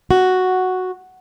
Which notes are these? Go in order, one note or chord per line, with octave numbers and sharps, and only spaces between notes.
F#4